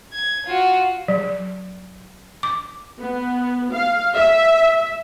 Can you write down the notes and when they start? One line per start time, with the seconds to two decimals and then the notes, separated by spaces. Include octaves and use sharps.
0.13 G#6
0.46 F4 F#4
1.08 F#3
2.43 D6
3.00 B3
3.73 F5
4.16 E5